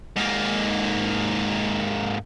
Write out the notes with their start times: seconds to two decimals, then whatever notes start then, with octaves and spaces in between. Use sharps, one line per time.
0.17 G#2 A#3